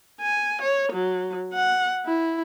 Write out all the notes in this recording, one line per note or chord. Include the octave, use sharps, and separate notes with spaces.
G#5
C#5
F#3
F#5
E4